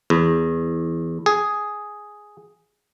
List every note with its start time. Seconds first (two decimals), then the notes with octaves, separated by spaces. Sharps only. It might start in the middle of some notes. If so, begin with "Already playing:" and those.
0.10 E2
1.26 G#4